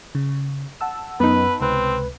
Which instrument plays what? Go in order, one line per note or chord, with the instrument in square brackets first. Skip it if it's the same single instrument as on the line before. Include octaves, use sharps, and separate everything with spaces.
[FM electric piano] C#3
F#5 A5 E6
[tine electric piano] F#2 [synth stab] B3 D#4 [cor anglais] B4
[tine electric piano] C#2 C3 B4 [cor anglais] C4